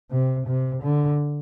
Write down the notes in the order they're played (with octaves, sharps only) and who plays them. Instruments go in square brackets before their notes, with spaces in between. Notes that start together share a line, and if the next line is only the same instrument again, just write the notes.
[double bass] C3
C3
D3